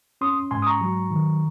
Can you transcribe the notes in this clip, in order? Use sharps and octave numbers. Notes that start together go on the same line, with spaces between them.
C#4 C6 D#6
G#2 G#5 C6
D#6
A#5 C#6
F#3
D#3